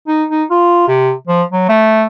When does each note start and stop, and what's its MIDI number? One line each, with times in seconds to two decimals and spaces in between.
0.08 0.24 63
0.30 0.43 63
0.50 0.86 65
0.88 1.12 48
1.27 1.43 53
1.52 1.65 54
1.69 2.05 57